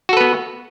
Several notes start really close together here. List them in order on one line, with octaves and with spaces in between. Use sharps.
F#4 A4 B4 B3